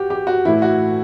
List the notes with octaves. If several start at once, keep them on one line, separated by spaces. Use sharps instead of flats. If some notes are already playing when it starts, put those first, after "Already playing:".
Already playing: F#4 G4
G4
F#4
A2 E3 E4
F#4